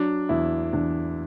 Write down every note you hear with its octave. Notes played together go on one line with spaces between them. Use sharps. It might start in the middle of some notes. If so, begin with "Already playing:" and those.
Already playing: F#3 D4
E2 E4
E2 D4